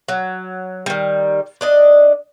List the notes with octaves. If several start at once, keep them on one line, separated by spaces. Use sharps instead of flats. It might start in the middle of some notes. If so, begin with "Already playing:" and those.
F#3
D#3 G3
D4 D5 D#5